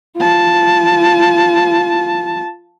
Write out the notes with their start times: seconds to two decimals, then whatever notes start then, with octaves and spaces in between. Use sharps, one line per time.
0.16 F4 A5